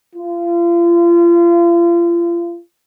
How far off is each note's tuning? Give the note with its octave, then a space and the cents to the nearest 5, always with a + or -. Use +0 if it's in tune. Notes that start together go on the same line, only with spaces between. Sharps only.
F4 -35